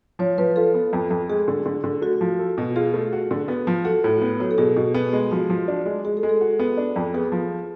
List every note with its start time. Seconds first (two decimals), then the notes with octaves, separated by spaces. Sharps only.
0.19 F3 C#5
0.38 F3 B4
0.56 F4 A4
0.74 B3
0.93 F2
1.10 F2
1.29 G#3 G#4
1.48 D3
1.66 D3
1.84 D3
2.02 A3 F#4
2.21 F3
2.39 A4
2.58 B2
2.76 F4 G#4
2.94 A3
3.13 F#4
3.31 D3
3.48 B3
3.67 F3
3.85 F#4 A4
4.04 A2
4.22 B3
4.40 F#3
4.51 A4
4.58 B2 G#4
4.76 B2
4.94 B3
5.13 G#3
5.31 F3 F#4
5.50 F3
5.68 D4
5.86 G#3
6.05 G#3 G#4
6.17 A4
6.23 G#3
6.29 A4
6.41 F#4
6.59 B3
6.77 D4
6.96 F2
7.14 B3 G#4
7.32 F3